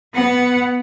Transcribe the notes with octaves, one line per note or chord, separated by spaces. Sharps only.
B3 F#5